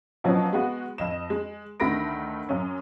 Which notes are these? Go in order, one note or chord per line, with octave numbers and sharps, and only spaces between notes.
B2 F3 F#3 C#4
G#3 B3 F#4
F2 D#5 E7
G#3
D2 D#3 A3 B5 A#6 D7
F#2 C#4